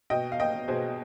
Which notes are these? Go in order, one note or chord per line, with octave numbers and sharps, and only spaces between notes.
B2 D#5 G5
F5
D#5 G5
B2 G#4 C5